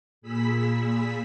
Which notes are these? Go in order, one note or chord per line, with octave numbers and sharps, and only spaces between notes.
A#2 G#4 B5 E6 B6